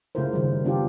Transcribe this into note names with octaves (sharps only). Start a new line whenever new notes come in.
C#3 A3 E4 F4 A#4 C5
D#3 G3
B3 D4 F4 G4